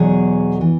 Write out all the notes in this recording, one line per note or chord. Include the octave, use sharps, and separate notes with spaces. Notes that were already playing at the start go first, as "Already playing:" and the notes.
Already playing: E2 B2 F#3 G#4
E3